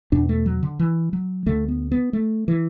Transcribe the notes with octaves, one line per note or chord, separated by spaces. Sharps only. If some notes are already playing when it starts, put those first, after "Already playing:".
E2 B2 D4
A3
F#3
D3
E3
F#3
D2 D3 A3
B3
B3
A3
E3